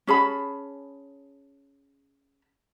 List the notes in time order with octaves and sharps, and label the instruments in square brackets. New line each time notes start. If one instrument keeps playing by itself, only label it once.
[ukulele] C#4 G#4 A5 B5